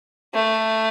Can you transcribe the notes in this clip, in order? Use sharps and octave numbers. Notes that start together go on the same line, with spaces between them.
A3